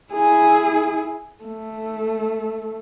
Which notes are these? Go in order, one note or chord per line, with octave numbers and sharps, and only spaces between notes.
E4 G#4
A3